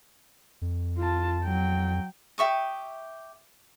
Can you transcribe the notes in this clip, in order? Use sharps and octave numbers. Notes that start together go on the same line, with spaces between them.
F2
F4 A5
F#3 G5
G4 E5 C#6 D#6